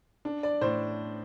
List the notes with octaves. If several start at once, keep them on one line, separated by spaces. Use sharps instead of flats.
D4
D5
A2 C5